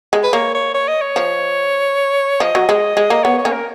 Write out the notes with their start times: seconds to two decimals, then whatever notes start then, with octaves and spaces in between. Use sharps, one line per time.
0.13 G#3
0.23 B4
0.33 A#3 C#5
0.54 C#5
0.74 C#5
0.88 D#5
1.02 C#5
1.16 F3
2.40 F3 D#5
2.55 F#3
2.69 G#3
2.97 G#3
3.10 A#3 D#5
3.23 B3 C#5
3.38 C#5
3.45 A#3 C#4
3.52 A#4